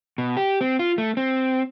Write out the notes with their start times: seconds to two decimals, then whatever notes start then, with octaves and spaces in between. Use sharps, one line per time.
0.18 B2
0.37 G4
0.61 C4
0.79 F4
0.98 A3
1.17 C4